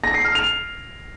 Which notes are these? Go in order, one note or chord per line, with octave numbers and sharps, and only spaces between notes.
A#6
C7
F6
F7